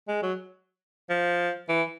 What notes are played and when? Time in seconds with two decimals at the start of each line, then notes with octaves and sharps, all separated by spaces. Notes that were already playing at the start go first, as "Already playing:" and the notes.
0.08 G#3
0.23 F#3
1.10 F3
1.69 E3